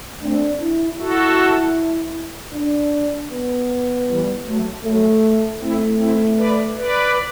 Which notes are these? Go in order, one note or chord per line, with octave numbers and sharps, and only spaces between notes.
A3 C4 D4
E4
E4 F#4 A4
D4
B3
E3 G3
F#3 A3
F#3 A3
A3 C4 E4
C4 E4
B4 D5
B4 D5